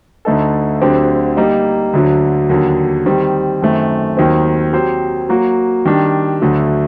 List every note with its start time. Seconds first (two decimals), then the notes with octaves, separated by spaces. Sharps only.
0.25 D2 D3 A3 D#4 A4
0.81 D2 D3 F#3 C4 G4
1.37 G3 A#3 D#4
1.93 D2 D3 F#3
2.49 D#2 D3 F#3
3.06 D#3 G3 C4
3.62 F#2 D#3 A3 C4
4.17 D#2 D#3 F#3 C4
4.73 F#3 C4 G4 C5
5.29 F#3 A#3 F#4
5.85 D#3 G3 D4
6.42 D2 D3 F#3 A3